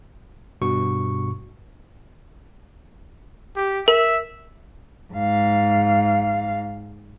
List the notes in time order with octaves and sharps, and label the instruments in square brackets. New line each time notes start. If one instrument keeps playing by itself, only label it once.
[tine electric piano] G2 B2 F#4 C#6
[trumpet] G4
[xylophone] A#4 [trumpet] E5
[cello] G#2 F5